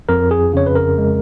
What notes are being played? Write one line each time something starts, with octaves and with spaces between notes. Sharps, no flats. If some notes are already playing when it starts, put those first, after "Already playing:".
F2 A#4
G#4
C#3 C#5
B4
A#4
G#3